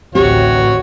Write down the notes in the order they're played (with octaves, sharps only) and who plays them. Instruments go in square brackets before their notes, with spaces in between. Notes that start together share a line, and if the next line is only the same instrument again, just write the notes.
[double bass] A1 D2 [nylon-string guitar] C4 G4 [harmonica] F#4 C#5